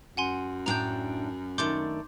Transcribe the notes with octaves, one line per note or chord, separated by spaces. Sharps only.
F#2 F#5 G#5 C6
A2 D4 G5 A#5 G6
D#3 A3 D4 C6 D6 G6